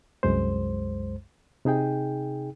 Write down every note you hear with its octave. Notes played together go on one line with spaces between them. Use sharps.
C2 F#2 G#3 C5
C3 D#4 G#4 G5